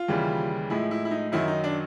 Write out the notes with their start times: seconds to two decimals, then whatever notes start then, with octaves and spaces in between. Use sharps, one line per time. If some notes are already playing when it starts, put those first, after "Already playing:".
Already playing: F4
0.08 D#2 C#3 E3 G3
0.70 A2 F3 G#3 E4
0.91 E4
1.05 E4
1.11 D#4
1.32 F#2 D#3 F#3 E4
1.48 D#4
1.64 D4